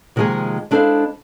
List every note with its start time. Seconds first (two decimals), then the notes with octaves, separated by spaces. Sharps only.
0.16 C3 D#3 F3 G#3 A#3 G#4
0.71 G#3 D4 E4 A4 C5 F5